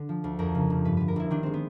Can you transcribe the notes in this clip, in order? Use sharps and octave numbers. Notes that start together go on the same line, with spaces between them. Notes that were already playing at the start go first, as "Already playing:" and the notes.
Already playing: D3 A4
F3
D2
F2 A#4
C#3
F1
G2 B4
D3 B4
A#4
G1 E4
D#3 D4
G#3 C4
B3